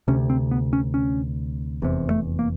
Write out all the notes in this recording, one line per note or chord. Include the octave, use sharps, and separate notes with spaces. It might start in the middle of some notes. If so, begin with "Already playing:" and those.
D2 C3 C#4
C4
B3
C#4
C#4
F1 E2 C3
A3
A#3